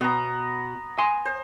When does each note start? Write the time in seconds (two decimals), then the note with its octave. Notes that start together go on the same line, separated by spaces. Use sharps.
0.01 B2 B3 A#5
0.98 G#5 C6
1.25 C5